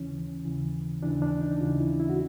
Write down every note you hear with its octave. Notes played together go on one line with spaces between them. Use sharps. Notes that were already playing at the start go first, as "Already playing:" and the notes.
Already playing: D#2 C#3 E3 C#4
D#2 C#3 E3
D#2 C#3 E3 D4
D4
D#4
D#2 C#3 E3 F4
E4
E4
F#4